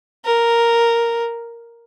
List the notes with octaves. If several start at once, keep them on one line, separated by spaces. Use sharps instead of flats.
A#4